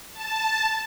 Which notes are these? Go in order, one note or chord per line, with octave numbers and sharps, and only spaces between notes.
A5